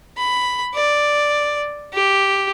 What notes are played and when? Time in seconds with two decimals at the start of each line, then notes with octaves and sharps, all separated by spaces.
0.17 B5
0.74 D5
1.93 G4